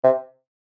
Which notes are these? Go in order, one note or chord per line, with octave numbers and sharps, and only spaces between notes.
C3